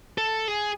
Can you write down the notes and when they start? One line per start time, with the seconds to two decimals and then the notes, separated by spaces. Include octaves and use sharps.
0.18 A4
0.48 G#4